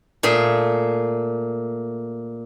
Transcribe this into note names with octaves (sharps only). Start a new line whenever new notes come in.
A#2 A3 G#4